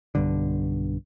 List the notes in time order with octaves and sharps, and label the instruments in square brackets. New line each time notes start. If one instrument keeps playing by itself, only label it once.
[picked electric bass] B1 G2 D3